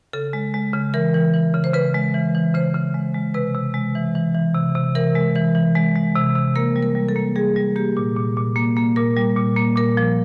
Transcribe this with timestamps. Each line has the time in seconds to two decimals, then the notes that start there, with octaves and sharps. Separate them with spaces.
0.13 C#3 A4
0.33 G#3
0.54 G#3
0.74 C#3
0.94 E3 A#4
1.14 E3
1.34 E3
1.54 C#3
1.64 C5
1.74 C#3 B4
1.94 G#3
2.14 E3
2.35 E3
2.54 C#3 C5
2.75 C#3
2.94 G#3
3.14 G#3
3.34 C3 B4
3.55 C3
3.74 G#3
3.95 E3
4.15 E3
4.35 E3
4.55 C3
4.75 C3
4.95 E3 A#4
5.15 G#3
5.35 E3
5.55 E3
5.75 G#3
5.95 G#3
6.16 C3
6.35 C3
6.56 A#3 A#4
6.76 G3
6.83 A#4
6.95 G3
7.09 A4
7.16 A#3
7.36 G3 G#4
7.56 G3
7.76 A#3 G4
7.97 A#2
8.16 A#2
8.37 A#2
8.56 A#3
8.77 A#3
8.96 A#2 A#4
9.16 G3
9.37 A#2
9.57 A#3
9.76 A#2 A#4
9.97 F3